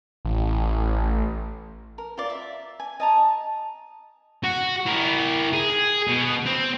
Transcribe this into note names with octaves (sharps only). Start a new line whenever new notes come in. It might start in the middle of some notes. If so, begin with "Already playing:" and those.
A1
A#4
F4 D5
E5
G#5
D#5 A5 A#5
F#4
E4 A#4
G#4
B2
C4